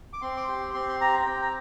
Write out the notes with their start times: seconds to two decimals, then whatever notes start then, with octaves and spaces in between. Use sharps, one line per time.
0.13 D6
0.22 C4 C6
0.37 D6
0.48 G4 C6
0.74 C4 C6
0.89 C6
1.01 G4 A#5
1.19 A#5
1.26 C4 G5
1.42 A#5